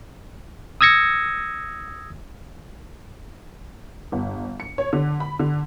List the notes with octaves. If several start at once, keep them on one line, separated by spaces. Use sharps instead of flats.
D#6 E6 G#6 A#6 C#7
G1
C#7
C#5
D3
B5
D3